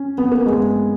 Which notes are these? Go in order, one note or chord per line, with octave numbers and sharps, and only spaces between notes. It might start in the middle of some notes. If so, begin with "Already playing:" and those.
Already playing: C#4
B3
A#3
G#3